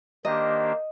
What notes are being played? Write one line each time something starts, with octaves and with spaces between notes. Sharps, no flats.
D#3 A#3 D4 G4 C5 D#5